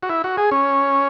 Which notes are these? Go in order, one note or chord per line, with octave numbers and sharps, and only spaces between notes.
F#4
E4
F#4
G#4
C#4